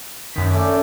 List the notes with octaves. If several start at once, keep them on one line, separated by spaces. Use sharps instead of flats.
F#2 D#3 B6
A3 C#4 D5 D6
C#4